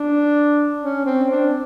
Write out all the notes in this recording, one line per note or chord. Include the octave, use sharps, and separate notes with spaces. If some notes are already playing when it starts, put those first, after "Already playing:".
Already playing: D4
C#4
C4
D4